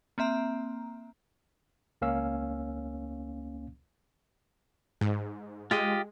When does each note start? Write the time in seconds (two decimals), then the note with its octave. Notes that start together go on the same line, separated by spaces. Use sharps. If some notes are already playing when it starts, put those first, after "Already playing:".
0.18 A#3 C4 E5 A#5
2.02 C#2 A#3 C#4 F5 E6
5.01 G#2
5.71 G#3 F4 G4 D#5